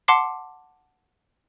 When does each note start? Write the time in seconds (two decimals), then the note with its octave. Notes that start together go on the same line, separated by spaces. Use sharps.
0.08 F#5 A5 C6 D6 C7